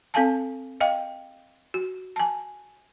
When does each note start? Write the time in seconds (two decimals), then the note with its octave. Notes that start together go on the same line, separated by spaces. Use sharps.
0.14 C4 A4 F5 G#5 A5
0.81 D#5 F5 G5
1.74 F#4
2.16 G#5 A5